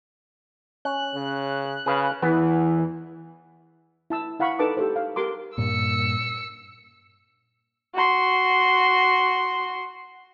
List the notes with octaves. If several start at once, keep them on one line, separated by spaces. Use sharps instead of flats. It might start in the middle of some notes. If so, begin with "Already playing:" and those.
C#4 F#6
C#3
C#3 G#4 B4 F5
E2 E3 B3
E4 A5 E6
E4 F5 F#5 B5 C#6
D#4 A4 B4 A5 D6
G4 A4 C5
F5
G4 A#4 C6 D6
G2 A#2 E6 C#7
F#4 C6